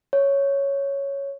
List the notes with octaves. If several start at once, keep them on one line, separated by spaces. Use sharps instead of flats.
C#5